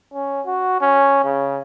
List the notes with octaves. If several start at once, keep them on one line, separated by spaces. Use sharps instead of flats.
C#4
F#4
C#4
C#3